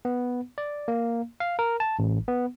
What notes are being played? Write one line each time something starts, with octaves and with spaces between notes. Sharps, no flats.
B3
D5
A#3
F5
A#4
A5
A1
B3